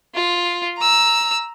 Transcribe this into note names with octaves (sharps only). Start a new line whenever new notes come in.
F4
A#5 E6